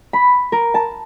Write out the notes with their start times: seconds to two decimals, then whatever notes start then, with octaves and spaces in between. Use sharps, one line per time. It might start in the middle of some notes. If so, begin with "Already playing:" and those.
0.13 B5
0.52 A#4
0.74 A5